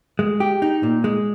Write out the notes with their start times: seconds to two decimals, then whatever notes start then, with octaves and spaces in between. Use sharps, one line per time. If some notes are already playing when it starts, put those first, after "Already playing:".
0.19 G#3
0.40 G4
0.62 D#4
0.83 A#2
1.04 G#3